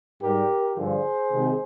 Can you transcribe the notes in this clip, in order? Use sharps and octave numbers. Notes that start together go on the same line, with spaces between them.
G#2 G3 G4 A#4
G2 D3 F3 G#4 C5
C3 D#3 G#3